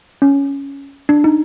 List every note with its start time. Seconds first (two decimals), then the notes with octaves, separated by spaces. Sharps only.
0.22 C#4
1.09 D4
1.24 D#4